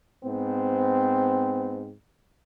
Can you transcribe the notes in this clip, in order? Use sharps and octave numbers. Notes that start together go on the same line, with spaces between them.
G#2 B3 C4